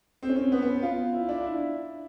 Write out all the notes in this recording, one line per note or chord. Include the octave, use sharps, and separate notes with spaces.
C4
C#4
C4
B3
B3
F4
E4
D4
E4